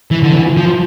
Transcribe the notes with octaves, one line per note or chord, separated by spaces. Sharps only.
E3
D3
E3
F3